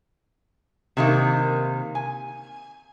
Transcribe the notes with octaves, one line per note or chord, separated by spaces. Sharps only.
C3 D#3 A#3
G#5